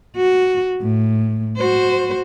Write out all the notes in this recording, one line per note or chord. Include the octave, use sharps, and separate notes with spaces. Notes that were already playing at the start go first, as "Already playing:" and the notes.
F#4
A2
F#4 C5